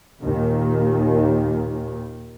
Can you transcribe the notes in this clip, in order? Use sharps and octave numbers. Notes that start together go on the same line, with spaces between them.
D#2 A#2 D#3